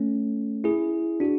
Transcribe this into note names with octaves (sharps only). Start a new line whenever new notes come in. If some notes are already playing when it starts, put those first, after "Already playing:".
Already playing: A3 C#4
E4 G#4
D4 F#4